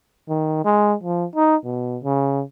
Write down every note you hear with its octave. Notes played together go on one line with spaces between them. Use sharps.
D#3
G#3
F3
D#4
B2
C#3